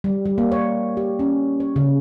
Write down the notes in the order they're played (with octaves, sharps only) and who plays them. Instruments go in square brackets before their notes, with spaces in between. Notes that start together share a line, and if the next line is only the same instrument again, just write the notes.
[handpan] G3
G3
A#3
C#5
G4
C#4
C#5
C#3